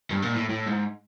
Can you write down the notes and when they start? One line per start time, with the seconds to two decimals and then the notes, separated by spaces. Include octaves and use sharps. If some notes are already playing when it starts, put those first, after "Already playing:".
0.11 G2
0.23 A#2
0.36 A2
0.50 A2
0.67 G#2